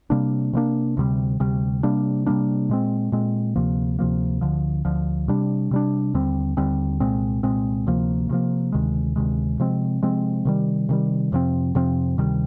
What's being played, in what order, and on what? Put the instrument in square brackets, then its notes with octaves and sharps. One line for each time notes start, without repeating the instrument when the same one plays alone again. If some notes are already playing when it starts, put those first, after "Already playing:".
[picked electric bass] C3 G3 A#3 D4
C3 G3 A#3 D4
D2 C3 G3
D2 C3 G3
C3 G3 A#3 D4
C3 G3 A#3 D4
A#2 G#3 C4
A#2 G#3 C4
D2 C3 F3 A#3
D2 C3 F3 A#3
D2 D3 F3
D2 D3 F3
C3 G3 D4
C3 G3 D4
D#2 D3 G3 C4
D#2 D3 G3 C4
C2 A#2 G#3 C4
C2 A#2 G#3 C4
D2 C3 F3 A#3
D2 C3 F3 A#3
D2 C3 D#3 G#3
D2 C3 D#3 G#3
C3 F3 G#3 C4
C3 F3 G#3 C4
C3 D#3 G3
C3 D#3 G3
F2 C3 F3 C4
F2 C3 F3 C4
D2 C3 D#3 G3